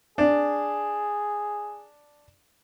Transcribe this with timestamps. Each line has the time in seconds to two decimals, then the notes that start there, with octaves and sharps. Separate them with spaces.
0.18 D4 G#4